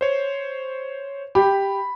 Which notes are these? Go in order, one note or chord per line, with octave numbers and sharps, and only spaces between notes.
C5 C#5
G4 B5